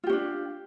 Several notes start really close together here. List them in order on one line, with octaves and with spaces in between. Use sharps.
F4 G4 C#4 D4